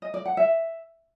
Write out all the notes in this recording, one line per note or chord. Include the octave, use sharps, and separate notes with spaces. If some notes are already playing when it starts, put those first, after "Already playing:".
D#5
D5
F#5
E5